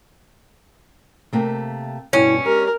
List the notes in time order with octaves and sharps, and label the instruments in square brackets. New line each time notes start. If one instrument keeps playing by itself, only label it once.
[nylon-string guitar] C3 A3 A#3
[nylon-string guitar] G2 B2 [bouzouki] C#4 [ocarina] E4
[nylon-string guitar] G#3 [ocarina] G4 [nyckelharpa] A#4